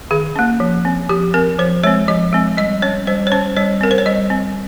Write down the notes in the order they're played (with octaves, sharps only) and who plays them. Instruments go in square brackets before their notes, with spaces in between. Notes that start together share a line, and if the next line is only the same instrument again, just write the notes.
[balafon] D#3 G#4
A#3 C#4
F3
C4
F3 G4
C4 A#4
F3 C5
G#3 C4 C#5
F3 D#5
G#3 C4
G3 D#5
C#4 C#5
G3 C5
C#5
C#4 C5
G3 C#5
C4 A#4
C5
C#5
G3 D#5
C4